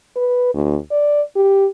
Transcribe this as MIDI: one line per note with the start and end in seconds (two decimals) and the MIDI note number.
0.16 0.52 71
0.54 0.77 38
0.91 1.22 74
1.36 1.67 67